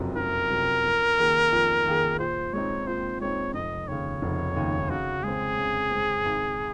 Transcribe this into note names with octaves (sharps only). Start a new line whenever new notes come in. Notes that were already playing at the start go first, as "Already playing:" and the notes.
Already playing: F#1 F2 C3 F#3
F#1 A#4
F2 C3 F#3
F2
D#3 A#3 F4 G#4
F2
D#3 A#3 F4 G#4
A#2 C5
G#3 C4 D#4 C#5
A#2 C5
G#3 C4 D#4 C#5
F1 D#5
D#2 C#3 C#5
F1
D#2 C#3
C#3 F#4
G#3 C4 G#4
C#3
G#3 C4
G#1